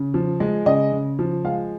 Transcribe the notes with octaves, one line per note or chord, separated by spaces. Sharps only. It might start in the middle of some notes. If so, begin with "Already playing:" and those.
Already playing: C#3
F3
G#3
C#3 D#5
C#3
F3
G#3 F5